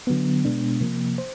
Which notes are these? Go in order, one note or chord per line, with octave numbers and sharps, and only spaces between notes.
D3 F#3 B3
B2 G#3 B3 D4
C3 F3 A#3
C5